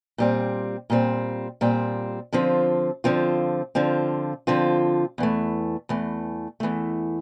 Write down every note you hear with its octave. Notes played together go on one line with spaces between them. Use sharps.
A#2 G3 C4
A#2 G3 C4
A#2 G3 C4
D3 F3 C4 F4
D3 F3 C4 F4
D3 F3 C4 F4
D3 F3 C4 F4
E2 E3 A3
E2 E3 A3
E2 E3 A3